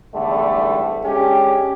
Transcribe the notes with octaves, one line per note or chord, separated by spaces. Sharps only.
E2 G#2 D3 G3 A3
G#3 C#4 D4 G4